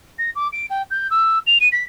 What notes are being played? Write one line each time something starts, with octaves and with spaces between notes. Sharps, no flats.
A#6
D6
D7
G5
G6
E6
F7
D#7
B6